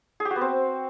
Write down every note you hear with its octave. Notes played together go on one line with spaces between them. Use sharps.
G#4
G4
F#4
B3
C4